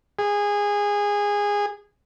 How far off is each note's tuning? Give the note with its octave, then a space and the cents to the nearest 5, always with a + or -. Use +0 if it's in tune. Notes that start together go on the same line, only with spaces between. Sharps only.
G#4 -20